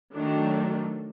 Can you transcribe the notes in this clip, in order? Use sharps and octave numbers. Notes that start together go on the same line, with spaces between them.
D#3 F#3 A3 D4